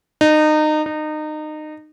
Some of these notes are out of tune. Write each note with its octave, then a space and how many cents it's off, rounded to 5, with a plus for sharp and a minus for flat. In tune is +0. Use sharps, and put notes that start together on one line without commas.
D#4 -25
D#4 -25